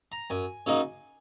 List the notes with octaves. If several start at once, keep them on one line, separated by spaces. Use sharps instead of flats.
A#5
F#2 G#5
C#3 F#3 A#3 D#4